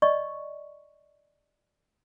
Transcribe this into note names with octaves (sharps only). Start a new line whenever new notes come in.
D5 D#5 C#6